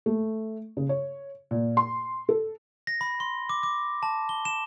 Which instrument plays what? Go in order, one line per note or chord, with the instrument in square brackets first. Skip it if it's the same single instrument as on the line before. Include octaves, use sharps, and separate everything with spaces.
[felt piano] A3
C#3
C#5
A#2
C6
A4
[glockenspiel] A#6
B5
C6
D6
D6
A5
G7
E7